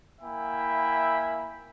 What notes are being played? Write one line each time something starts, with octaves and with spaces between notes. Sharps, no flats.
A#3 E4 E5 G5 G#5 B5